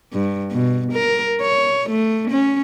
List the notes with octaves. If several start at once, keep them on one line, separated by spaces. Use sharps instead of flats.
G2
B2
A#4
C#5
A3
C#4